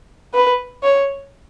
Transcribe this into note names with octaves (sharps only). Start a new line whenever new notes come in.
B4
C#5